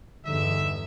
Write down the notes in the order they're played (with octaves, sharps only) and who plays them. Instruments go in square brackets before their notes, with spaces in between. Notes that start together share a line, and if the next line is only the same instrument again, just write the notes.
[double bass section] E2 G2 [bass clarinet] D3 [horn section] D#4 E5